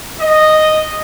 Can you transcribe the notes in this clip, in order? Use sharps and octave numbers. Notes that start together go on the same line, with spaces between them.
D#5